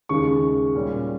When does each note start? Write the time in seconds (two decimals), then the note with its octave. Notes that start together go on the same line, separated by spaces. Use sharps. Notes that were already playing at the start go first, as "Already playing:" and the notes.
0.09 D#2 C#3 G#3 C#6
0.75 A#2 G3 C#4